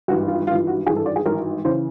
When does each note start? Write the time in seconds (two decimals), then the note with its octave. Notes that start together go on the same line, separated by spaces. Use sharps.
0.08 G#1 G2 E3 F#4
0.28 F4
0.47 G#1 G2 E3 F4
0.67 F#4
0.86 G#1 G2 E3 G#4
0.96 A4
1.06 D5
1.16 G#4
1.26 G#1 G2 E3 A#4
1.65 C#3 E3 C5